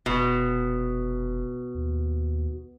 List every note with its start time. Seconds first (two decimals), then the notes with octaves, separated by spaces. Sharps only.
0.06 F1 B2
1.75 D#2